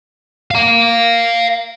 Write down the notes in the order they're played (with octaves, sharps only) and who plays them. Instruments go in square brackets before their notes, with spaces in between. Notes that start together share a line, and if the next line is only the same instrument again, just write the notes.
[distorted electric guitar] F5 A#5